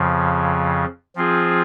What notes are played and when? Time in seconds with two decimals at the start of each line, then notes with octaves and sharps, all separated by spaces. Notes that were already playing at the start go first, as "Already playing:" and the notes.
Already playing: F2 C#3 F3
1.15 F3 C4 F4 G#4